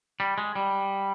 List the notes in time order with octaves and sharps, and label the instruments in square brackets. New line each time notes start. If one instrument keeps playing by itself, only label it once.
[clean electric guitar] G3
G#3
G3